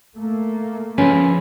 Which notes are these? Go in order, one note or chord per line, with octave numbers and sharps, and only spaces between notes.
A3 A#3
F3 C#4 G#4 B4